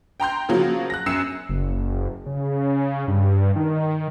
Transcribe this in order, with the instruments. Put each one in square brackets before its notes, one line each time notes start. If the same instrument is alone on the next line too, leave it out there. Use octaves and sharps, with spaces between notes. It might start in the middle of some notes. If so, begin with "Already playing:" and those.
[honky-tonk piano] G5 A#5 C6 G6
C#3 F3 F#3 A#3
F#6 A#6
F#2 E6 C7 C#7 E7
[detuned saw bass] F#1
C#3
G2
D#3